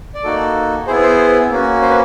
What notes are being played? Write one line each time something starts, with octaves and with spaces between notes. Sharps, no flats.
D5
A#3 D#4 F#4 A4
B3 E4 G#4 C5
C5
A#3 C#4 F#4
C5
B4